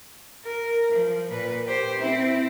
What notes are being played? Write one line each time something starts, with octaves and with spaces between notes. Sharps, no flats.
A#4
F3
A#2 B4
G4 C5
C4 E4